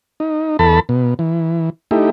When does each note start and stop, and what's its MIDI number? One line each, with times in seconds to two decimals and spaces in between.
0.20 0.57 63
0.59 0.80 40
0.59 0.80 69
0.59 0.80 81
0.59 0.80 83
0.89 1.14 47
1.19 1.70 52
1.91 2.10 57
1.91 2.10 63
1.91 2.10 64
1.91 2.10 67